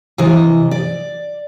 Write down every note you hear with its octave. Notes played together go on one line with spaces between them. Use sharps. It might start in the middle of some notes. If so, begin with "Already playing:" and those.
C3 E3 D#5
D5